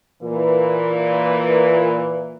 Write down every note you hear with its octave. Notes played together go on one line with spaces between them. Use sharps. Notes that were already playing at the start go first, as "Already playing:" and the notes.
A#2 E3